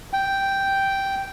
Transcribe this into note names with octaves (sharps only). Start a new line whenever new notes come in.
G5